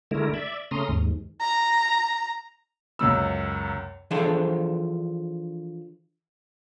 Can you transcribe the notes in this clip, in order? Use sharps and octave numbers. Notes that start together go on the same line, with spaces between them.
D3 G#3 A3 E4 A#4
D5 E5
C#3 A3 C#4 A#5 C6 D#6
D#2 G#2
A#5
C#2 F#2 E6
E3 F3 D4 G#4 A4 C5